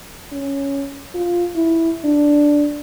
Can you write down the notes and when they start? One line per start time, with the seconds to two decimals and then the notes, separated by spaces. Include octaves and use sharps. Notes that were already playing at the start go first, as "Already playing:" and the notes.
0.32 C#4
1.15 F4
1.56 E4
2.04 D4